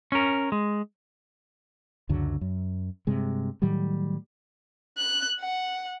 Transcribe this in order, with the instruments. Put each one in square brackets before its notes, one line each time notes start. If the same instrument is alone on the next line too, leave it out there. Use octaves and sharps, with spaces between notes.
[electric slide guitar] C#4 A#4
G#3
[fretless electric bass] C#2 F#2 D3 F#3
F#2
G2 C3 G#3
A2 D#3 F#3 G3
[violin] F#6
F#5